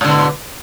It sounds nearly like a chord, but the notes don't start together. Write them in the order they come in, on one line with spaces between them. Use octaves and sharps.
G#2 D3 B2